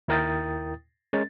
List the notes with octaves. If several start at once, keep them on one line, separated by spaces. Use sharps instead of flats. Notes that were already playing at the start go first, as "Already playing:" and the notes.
D#2 E4 A#4 G5 D#6 A6
G#3 C#4 A#4 A6